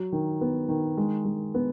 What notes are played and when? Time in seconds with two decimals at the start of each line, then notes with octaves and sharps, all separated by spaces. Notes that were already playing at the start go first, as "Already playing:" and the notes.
Already playing: F#3
0.12 D#3
0.41 B3
0.69 D#3
0.97 G#3
1.25 G#3
1.54 B3